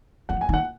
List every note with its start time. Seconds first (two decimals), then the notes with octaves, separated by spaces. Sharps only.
0.29 F3 F#5
0.41 G#5
0.49 D#3
0.54 F#5